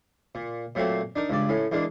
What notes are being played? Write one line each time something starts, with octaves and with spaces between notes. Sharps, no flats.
A#2
A#2 F#3 A3 A#3 C4
D4 D#4 A#4
C#2 G2 D5
A2 C#4
E2 G#3 A#3 D4